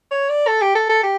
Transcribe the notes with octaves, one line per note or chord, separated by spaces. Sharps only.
C#5
D5
A4
G4
A4
A4
G4